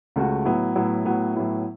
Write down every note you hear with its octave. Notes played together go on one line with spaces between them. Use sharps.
C#2 C#3 A3 F#4
A2 F#3 B3 E4
A2 F#3 B3 E4
A2 F#3 B3 E4
A2 F#3 B3 E4